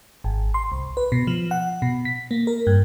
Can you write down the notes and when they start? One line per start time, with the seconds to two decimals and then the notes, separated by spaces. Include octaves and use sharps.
0.24 G#1
0.54 C6
0.72 C2
0.97 B4
1.12 B2
1.27 F3
1.51 F#5
1.82 B2
2.05 B6
2.31 A#3
2.47 A#4
2.67 G2